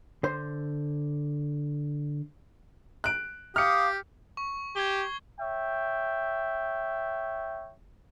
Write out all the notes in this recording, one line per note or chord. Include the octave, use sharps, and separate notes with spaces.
D3 C5 C6
F#6 D7
G4 F5 D6 D#6 F6 C#7
C#6
G4 G#6 C7 G7
C#5 E5 G5